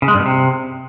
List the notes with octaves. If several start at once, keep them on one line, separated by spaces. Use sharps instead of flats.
C#3
G#3
G2
B2
C3